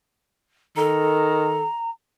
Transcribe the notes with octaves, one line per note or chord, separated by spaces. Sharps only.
D#3 A4 A#5